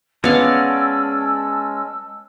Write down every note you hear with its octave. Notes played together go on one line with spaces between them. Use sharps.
G#3 B3 C#4 D5 F5 A5 E6